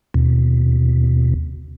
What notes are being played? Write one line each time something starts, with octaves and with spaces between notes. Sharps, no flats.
D#2 B2